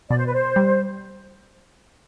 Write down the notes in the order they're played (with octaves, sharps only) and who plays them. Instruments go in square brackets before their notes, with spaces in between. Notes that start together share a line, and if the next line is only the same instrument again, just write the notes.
[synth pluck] B2 [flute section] D5
[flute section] C5
B4
C5
[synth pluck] G3